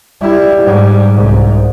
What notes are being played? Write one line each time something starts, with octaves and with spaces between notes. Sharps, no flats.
G3 E4
G#2 G3
C2 G#2